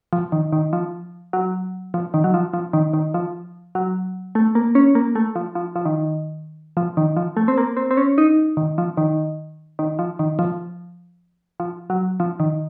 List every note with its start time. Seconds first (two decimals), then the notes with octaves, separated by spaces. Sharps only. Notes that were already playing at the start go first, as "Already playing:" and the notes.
0.13 F3
0.32 D#3
0.53 D#3
0.73 F3
1.33 F#3
1.94 F3
2.14 D#3
2.24 F#3
2.34 F3
2.54 F3
2.73 D#3
2.94 D#3
3.14 F3
3.75 F#3
4.35 A3
4.55 A#3
4.75 C#4
4.95 A#3
5.15 A3
5.36 F3
5.55 F3
5.76 F3
5.85 D#3
6.77 F3
6.97 D#3
7.17 F3
7.37 A3
7.48 C4
7.58 A#3
7.77 C4
7.91 C4
7.97 C#4
8.18 D#4
8.57 D#3
8.78 F3
8.97 D#3
9.79 D#3
9.99 F3
10.19 D#3
10.39 F3
11.60 F3
11.90 F#3
12.20 F3
12.40 D#3